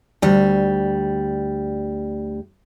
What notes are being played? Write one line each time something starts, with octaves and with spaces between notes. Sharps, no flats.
D2 G3